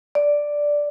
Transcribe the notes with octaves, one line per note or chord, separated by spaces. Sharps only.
D5